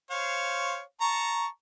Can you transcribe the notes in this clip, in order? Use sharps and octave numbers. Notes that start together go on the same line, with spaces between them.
C5 C#5 F5
A5 A#5 C#6